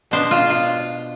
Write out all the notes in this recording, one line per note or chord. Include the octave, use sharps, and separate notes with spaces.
B2 B3 D4 C5
F4
F4